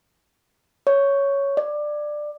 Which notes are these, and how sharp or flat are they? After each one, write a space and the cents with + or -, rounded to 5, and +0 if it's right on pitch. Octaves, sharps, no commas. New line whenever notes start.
C#5 +5
D5 +15